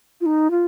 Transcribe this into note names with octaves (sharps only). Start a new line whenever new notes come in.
F4
D#4
F4